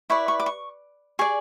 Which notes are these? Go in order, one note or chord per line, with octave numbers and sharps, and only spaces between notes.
E4 B4 D5 C#6
C#6
D6
C#6
G#4 D5 C#6